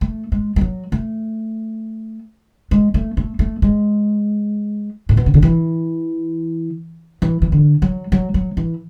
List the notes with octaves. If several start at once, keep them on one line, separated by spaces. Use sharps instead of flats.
A3
G#3
G#3
F#3
A3
G#3
A3
A3
A3
G#3
A2
B2
C#3
D3
E3
E3
E3
D3
F#3
F#3
F#3
E3